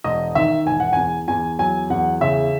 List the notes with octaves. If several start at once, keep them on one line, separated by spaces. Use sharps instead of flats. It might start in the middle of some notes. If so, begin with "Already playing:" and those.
E1 D#5
D#3 E5
E1 G#5
F#5
E2 G#5
E2 G#5
F#3 G#5
E2 F#5
C#3 E5